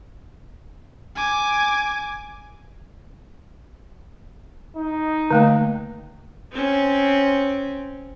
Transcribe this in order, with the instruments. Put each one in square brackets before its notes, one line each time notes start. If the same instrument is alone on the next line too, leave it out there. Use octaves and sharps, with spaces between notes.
[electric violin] G#5 D6
[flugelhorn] D#4
[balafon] D3 A3 A#3
[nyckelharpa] C4 C#4